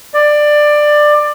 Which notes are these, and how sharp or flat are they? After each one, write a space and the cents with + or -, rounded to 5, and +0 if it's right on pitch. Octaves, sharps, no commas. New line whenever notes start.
D5 +15